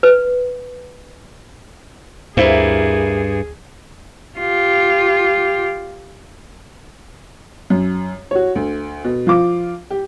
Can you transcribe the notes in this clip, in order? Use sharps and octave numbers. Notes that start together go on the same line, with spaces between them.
B4
D2 G2 A#3 E4 G#4 A#4 C5 F5
F4 G4
F#2
F#4 C#5
D2
B2
F3 F4 D6
G4